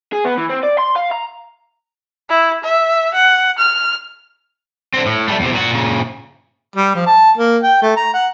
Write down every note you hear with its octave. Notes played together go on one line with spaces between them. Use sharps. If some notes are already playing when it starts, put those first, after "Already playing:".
G#4
B3
E3
C4
D5
C6
F5
A#5
E4
E5
F#5
F6
D3 C4
A2
G3 A3
E2 C3
A#2 F#4
A#2 C#3
G3
F3
A5
A#3
G5
A3
A#5
F#5